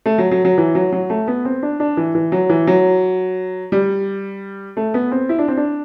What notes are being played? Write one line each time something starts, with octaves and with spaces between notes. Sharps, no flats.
A3
F#3
F#3
F#3
E3
F#3
F#3
A3
B3
C4
D4
D4
E3
E3
F#3
E3
F#3
G3
A3
B3
C4
E4
D4
C4
D4